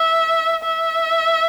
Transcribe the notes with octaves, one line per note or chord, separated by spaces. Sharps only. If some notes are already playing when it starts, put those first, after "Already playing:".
Already playing: E5
E5